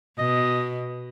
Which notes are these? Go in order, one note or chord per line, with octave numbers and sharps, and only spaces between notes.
B2 D#5